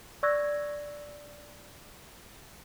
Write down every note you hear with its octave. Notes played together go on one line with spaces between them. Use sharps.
D5 C#6 E6 F#6 G#6 A#6